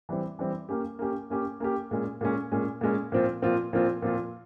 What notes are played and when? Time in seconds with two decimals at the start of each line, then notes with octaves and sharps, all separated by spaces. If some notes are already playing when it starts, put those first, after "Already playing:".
0.09 E3 G3 C4
0.39 E3 G3 C4
0.69 A#3 C#4 G4
0.99 A#3 C#4 G4
1.30 A#3 C#4 G4
1.60 A#3 C#4 G4
1.91 A#2 G#3 C#4
2.21 A#2 G#3 C#4
2.52 A#2 G#3 C#4
2.81 A#2 G#3 C#4
3.12 A#2 F3 C4 F4
3.42 A#2 F3 C4 F4
3.73 A#2 F3 C4 F4
4.02 A#2 F3 C4 F4